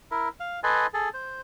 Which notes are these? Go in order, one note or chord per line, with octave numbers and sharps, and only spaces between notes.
E4 A#4
F5
A4 B4 D#5 G#5 C6
G#4 A4
C5